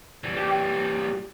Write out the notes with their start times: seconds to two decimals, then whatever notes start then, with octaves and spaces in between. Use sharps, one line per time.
0.24 E3 G3
0.37 G4